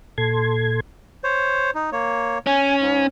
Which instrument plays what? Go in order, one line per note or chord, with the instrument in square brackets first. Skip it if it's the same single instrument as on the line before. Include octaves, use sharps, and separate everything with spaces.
[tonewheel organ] A#2 A4 C6 G#6
[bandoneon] C5 C#5
D#4
A#3 C#5
[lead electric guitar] C#4 [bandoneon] G#5
[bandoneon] G#2